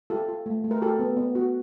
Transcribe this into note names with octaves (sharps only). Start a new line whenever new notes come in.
F4 G4 A4
F4
A3
A3
A#4
F#4 G4 A4
B3
B3
F#4